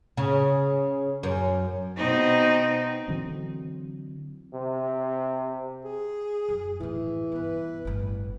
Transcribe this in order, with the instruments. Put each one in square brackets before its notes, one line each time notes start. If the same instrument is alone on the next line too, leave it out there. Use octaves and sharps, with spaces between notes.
[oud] C#3
F#2
[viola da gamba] B2 C4 D#4
[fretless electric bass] D3 E3 F#3 C4
[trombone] C3
[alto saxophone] G#4
[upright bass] F#2
[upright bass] A2 D#3 [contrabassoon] E3
[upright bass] G2 B3 [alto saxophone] B4
[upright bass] G1 A2